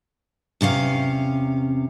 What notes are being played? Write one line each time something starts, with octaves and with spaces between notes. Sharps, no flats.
E2 C3 C#4 F5